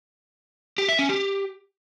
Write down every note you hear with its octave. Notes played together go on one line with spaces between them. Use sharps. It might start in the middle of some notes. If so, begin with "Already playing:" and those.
G4
E5
C#4
G4